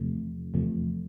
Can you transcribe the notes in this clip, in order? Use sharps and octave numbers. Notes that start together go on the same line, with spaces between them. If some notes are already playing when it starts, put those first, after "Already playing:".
Already playing: E2 C3 F3 A3
E2 C3 F3 A3